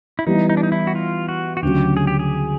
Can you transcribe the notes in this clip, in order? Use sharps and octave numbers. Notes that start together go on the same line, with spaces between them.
E4
E3 G3 B3 D#4
D#4
D4
D#4
E4
F#4
F4
F#4
F#4
D2 C#3 F#3 G4
G#4
G4
G#4